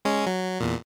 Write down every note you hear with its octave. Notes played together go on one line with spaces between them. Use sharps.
G#3 C#4
F#3
E2 A#2